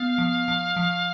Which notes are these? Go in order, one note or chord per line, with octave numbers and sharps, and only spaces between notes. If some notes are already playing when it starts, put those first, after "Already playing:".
Already playing: B3 F5
F3
F3
F3